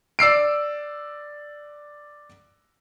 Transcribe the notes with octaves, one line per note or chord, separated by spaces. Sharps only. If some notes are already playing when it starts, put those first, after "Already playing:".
D5 E6 C7 D7